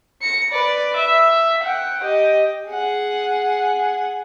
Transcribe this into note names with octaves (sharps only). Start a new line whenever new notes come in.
A#6 C#7
B4 D5
E5
F#5 G5
G4 D#5
G#4 F#5